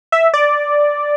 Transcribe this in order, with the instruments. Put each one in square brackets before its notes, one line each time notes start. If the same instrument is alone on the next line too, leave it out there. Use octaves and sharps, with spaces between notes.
[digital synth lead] E5
D5